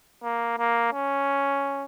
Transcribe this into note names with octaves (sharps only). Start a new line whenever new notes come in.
A#3
A#3
C#4